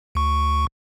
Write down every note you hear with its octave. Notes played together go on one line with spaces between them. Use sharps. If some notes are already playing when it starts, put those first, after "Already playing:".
D2 C#6